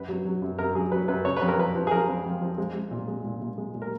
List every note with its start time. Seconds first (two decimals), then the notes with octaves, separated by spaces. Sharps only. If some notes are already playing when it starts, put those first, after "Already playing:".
Already playing: F#2 B4
0.09 F#3
0.25 F#3
0.42 F#2
0.58 F#2 A#4
0.75 F#3 G#4
0.92 F#3 B4
1.08 F#2 B4
1.25 C#3 C#5
1.37 F2 B4
1.48 A#4
1.58 F3 B4
1.75 F3
1.87 G#4
1.91 F3 A#4
2.08 F2
2.25 F2
2.41 F3
2.58 G#3
2.74 G#3
2.91 A#2
3.08 G#3
3.25 A#2
3.41 A#2
3.58 G#3
3.74 A#2
3.82 A#4